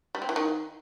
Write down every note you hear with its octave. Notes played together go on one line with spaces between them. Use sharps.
G3
C4
E3
D#3